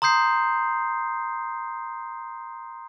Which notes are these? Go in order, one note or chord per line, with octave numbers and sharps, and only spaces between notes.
A#5 C6 D#6 G6 C7